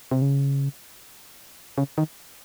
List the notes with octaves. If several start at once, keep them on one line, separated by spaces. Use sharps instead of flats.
C3
C#3
C#3
D#3